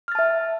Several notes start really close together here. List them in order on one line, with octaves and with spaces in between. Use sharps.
F6 A6 A5 E5